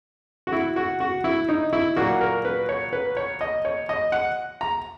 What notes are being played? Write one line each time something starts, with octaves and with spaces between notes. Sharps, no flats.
F#4
E4
F#4
F#4
E4
D#4
E4
A#2 F#3 A#3 F#4
A#4
B4
C#5
B4
C#5
D#5
C#5
D#5
F#5
A#5